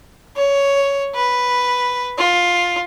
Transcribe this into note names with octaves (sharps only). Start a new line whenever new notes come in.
C#5
B4
F4